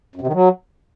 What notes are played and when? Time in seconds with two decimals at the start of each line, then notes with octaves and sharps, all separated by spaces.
0.16 F#2
0.21 C3
0.27 D#3
0.33 F#3